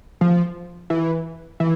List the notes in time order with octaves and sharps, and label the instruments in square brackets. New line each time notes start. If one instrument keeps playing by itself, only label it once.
[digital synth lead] F3
E3
E3